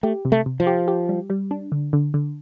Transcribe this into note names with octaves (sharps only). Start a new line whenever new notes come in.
A3 G4
C3
A3
C3
F3
G4
G4
G3
G3
D4
D3
D3
D3